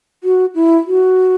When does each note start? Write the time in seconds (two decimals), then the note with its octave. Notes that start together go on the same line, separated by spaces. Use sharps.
0.24 F#4
0.55 E4
0.87 F#4